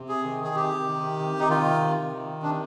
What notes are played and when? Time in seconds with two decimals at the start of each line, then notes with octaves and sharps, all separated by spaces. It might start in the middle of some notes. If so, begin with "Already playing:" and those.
Already playing: C3
0.09 G#4
0.24 D#3
0.44 G#4
0.55 C3 G4
0.87 D#3
1.19 C3
1.39 D#4
1.49 D#3 F4
1.80 C3
2.12 D#3
2.43 C3 D4